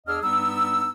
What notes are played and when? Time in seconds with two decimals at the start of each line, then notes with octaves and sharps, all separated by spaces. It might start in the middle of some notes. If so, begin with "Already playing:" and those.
0.07 E2 D4 G#4 D#5 E6 F6
0.22 G2 G3 B3 D#4 E6